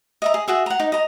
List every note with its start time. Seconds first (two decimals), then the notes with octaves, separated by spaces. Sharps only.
0.22 D#5 E5 A#5
0.34 G#4
0.48 F#4 G#4 E5
0.66 F#5 A#5
0.79 D#4
0.92 D#5 A#5